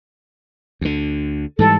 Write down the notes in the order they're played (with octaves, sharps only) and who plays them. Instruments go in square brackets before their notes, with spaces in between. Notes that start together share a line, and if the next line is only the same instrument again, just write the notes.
[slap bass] D2 D3
[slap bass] G#2 E3 G3 [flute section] A4